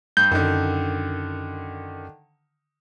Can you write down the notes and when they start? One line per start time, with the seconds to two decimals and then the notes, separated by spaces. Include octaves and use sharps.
0.17 G2 G6
0.32 F#2 D3 D#3